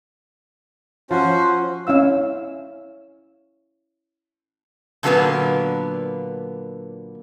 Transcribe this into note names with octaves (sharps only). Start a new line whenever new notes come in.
F3 C#4 F#4 C5
C#4 E4 F5 E6
A#2 D3 F#3 A#3 B3 B4